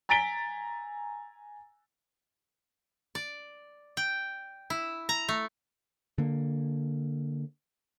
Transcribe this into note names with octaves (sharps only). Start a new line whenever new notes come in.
G#5 A#5 A6 B6 D7 G7
D5
G5
E4
A#5
A3
D3 A#3